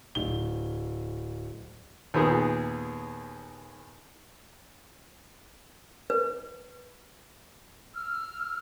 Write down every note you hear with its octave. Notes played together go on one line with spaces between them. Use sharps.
D1 G7
D#2 A#2 B3 G#4
B4
E6 F6